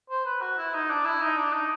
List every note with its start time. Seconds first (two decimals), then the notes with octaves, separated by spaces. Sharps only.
0.10 C5
0.25 B4
0.41 F#4
0.57 E4
0.74 D#4
0.90 D4
1.05 E4
1.21 D#4
1.37 D4
1.53 D#4